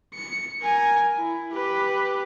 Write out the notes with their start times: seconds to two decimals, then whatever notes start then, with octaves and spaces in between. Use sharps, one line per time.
0.14 C#7
0.62 A#4 G#5
1.17 E4
1.53 G4 B4